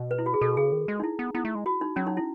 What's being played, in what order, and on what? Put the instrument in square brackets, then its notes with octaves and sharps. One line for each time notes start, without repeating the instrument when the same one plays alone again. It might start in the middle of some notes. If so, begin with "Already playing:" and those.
Already playing: [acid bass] B2
[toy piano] B4
E4
F#4
G#4
[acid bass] B2 [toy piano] A4
[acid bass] C#3 [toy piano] G#4
[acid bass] D#3
G#3
[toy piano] D#4
E4
[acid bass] B3
[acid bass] B3 [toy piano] E4
[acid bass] A3
G#3
[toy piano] F#4
D#4
[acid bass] F#3 [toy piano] C#4
[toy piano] D#4
E4